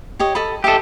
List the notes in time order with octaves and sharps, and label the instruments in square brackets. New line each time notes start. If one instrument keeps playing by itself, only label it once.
[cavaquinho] G4 C#5 D#5
A4 D#5 B5
[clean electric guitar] G4 A4 [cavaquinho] D#5 E5